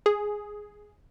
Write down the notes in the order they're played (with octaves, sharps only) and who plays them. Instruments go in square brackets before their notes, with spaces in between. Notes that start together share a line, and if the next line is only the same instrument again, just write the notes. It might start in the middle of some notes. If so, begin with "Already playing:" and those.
[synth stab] G#4